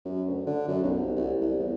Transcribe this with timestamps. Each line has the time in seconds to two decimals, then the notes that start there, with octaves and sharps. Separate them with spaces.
0.05 F#2
0.28 D2
0.47 D3
0.68 F#2
0.84 B1
0.97 C2
1.16 C2
1.42 C2
1.59 E2